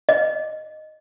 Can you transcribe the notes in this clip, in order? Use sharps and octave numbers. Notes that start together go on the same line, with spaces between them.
D#5